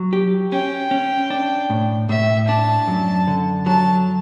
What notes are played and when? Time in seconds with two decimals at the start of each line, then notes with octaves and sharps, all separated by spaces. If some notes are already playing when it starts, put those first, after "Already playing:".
Already playing: F#3
0.13 G4
0.52 C#4 G5
0.91 C#4
1.30 D4
1.70 A2
2.09 A2 E5
2.48 D4 A5
2.88 F#2
3.28 D3
3.66 F#3 A5